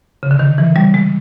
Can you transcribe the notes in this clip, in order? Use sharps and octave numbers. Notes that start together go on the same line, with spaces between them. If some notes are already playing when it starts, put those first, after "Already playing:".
C#3
D3
D#3
E3
G3
G#3